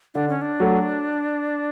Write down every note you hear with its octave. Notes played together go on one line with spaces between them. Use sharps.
D3 D4
C#4
D4
F#3 A3